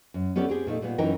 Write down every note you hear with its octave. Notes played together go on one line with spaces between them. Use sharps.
F#2
B3 C#4 G4 A4 D5
C4 G4 G#4
A#2 A3 D#4
A#2 G3 B3
F#2 E3 C#4 D#4 A#4 G5